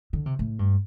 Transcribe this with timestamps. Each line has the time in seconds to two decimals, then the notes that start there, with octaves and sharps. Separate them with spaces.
0.13 D3
0.26 C3
0.39 A2
0.59 G2